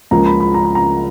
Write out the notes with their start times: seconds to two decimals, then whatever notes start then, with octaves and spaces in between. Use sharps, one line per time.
0.11 C#2 C#3 F3 A#3 A#5
0.26 B5
0.40 B5
0.54 A#5
0.65 B5
0.75 A#5